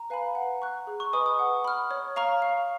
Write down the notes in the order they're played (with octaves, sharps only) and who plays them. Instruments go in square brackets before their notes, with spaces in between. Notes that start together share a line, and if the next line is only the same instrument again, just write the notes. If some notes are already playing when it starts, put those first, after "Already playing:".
Already playing: [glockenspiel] A#5
[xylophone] B4 F5 G#5 B5
F#5
C#6 F#6
G#4
[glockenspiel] C#6
[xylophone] B4 D#5 G#5 B5 [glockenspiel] D#6
[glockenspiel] D#6
[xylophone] F#5
B5 F6
C#5
F5 A#5 C#6 F6
F5